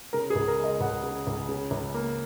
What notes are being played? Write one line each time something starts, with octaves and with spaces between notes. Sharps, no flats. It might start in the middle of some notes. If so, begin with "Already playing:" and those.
C#3 A#4
G#4
C#2
A#4
G#3 D#5
C#2 F#5
C#3
C#2
C#3
C#2
A#3